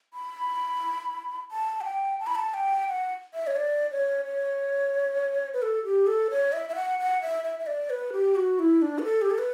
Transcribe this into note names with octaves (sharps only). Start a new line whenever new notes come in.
B5
A5
F#5
G5
A5
B5
A5
G5
F#5
E5
C#5
D5
C#5
C#5
B4
A4
G4
A4
C#5
E5
E5
F#5
F#5
E5
E5
E5
D5
B4
G4
F#4
E4
D4
B4
A4
G4
A4
B4